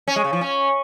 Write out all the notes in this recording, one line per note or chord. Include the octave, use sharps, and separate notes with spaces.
C#4
G#3
C#3
F3
C#4